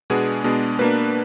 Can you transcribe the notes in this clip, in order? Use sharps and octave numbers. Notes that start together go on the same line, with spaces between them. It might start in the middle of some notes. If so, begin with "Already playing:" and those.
B2 G#3 B3 D4 G#4
B2 G#3 B3 D4
B2 A#3 D4 B4